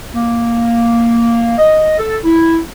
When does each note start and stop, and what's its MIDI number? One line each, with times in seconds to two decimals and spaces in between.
0.14 1.53 58
1.58 1.98 75
1.99 2.17 69
2.25 2.58 64